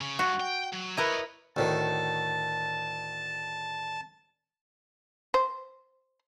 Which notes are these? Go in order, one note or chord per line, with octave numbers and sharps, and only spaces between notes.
C#3
G2 F#4
G5
F#3
E4 A#4 B4 C#5 D#5
D2 A2 D#3 A5
C5